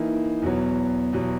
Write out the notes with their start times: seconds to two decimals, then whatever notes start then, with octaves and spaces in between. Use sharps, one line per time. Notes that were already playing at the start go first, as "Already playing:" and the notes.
Already playing: E3 A#3 D#4
0.42 E2 B2 F#3
1.13 E2 B2 F#3